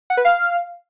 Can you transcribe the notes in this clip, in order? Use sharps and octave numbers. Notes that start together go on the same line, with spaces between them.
F#5
B4
F5